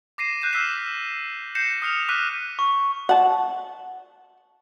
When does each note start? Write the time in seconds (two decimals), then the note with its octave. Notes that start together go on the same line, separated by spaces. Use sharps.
0.18 D6 A#6 C7 D#7 E7
0.41 F#6 G6 C7 E7
0.53 D6 E6 F6 B6 C7 E7
1.55 G6 A#6 C7 C#7 E7
1.82 D#6 F6 C#7 F7
2.09 D6 F6 F#6 B6 D#7
2.59 C#6
3.09 F#5 A5